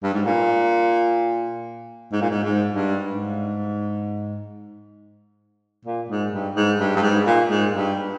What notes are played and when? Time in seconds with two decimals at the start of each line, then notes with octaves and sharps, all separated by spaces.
0.03 G2
0.14 G#2
0.26 A#2
2.12 G#2
2.21 A#2
2.30 G#2
2.43 G#2
2.74 G2
3.06 G#2
5.85 A#2
6.09 G#2
6.32 G2
6.56 G#2
6.80 G2
6.96 G2
7.02 G#2
7.27 A#2
7.49 G#2
7.73 G2